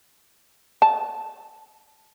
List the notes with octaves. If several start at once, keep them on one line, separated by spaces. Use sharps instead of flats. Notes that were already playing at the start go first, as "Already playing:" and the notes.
A5